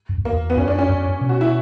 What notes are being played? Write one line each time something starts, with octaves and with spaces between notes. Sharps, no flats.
F#2
E2
A#3
E2
B3
F#2 C#4
D4
C#4
F#2
B2
F#4
E4